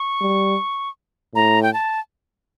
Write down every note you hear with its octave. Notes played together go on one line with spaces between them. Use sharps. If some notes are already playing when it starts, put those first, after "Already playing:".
Already playing: C#6
G3
A2 A#5
G5
A5